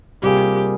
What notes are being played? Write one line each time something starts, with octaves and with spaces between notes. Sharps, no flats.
C3 G3 A#3 F4 G4 G#4